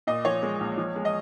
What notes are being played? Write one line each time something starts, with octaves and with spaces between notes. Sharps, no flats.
A#2 D#5
F3 C#5
G#3
A#1
F3
G#3
D#5